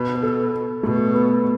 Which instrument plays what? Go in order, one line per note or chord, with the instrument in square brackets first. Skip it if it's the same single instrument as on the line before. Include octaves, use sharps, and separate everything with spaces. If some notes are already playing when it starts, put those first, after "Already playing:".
Already playing: [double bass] B2 [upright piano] B4
[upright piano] B4
A4
[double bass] B2 [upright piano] A3
[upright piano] B3